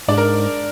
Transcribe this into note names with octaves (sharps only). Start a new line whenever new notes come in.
G#2 D4 D5
A#4